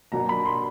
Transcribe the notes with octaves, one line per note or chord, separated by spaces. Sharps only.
B2 F#3 A#3 D4 A#5
B5
C6